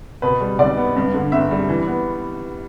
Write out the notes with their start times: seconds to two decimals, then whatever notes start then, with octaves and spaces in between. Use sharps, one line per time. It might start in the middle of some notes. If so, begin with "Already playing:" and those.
0.22 B2 B4
0.41 G3
0.59 B1 D5
0.77 B3
0.96 G2
1.14 D3
1.32 G1 E5
1.51 G3
1.69 E3
1.87 B3